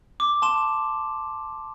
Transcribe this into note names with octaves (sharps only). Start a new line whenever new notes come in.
D6
A5 C6 E7